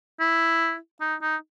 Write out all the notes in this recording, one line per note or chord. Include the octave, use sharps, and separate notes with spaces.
E4
D#4
D#4